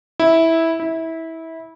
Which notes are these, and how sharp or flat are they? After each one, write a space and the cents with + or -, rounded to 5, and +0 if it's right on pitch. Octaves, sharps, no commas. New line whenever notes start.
E4 -10
E4 -20